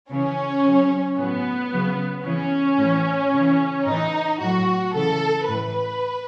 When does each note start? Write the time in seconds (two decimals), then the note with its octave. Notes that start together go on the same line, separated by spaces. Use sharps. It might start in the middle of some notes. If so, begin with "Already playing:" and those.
0.10 C#3 E3 C#4
0.64 C#3 F#3
1.17 A2 F#3 B3
1.70 C#3 F#3
2.24 C#3 E3 C#4
2.78 A2 E3
3.33 C#3 E3
3.86 A2 D#4
3.91 E3
4.40 A2 F#3 F#4
4.94 C#3 E3 A4
5.47 A2 E3 B4